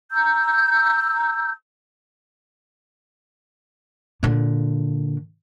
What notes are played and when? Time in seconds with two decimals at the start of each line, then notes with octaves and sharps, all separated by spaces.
0.12 A#5 E6 G6
4.23 A#2 D3